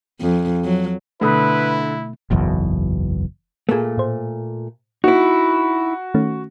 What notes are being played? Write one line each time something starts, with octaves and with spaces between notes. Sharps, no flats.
F2
F#3
B2 D3 A3 E4 B4 D#6
F#1 B1 E2 B2
A#2 A3 A#3 G#4
A2 C5
A#3 D#4 E4 F#4
D#3 A3 C#4